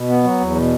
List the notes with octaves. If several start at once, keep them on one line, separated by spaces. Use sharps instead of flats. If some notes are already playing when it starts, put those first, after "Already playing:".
Already playing: B2
B3
F#3
E2
B2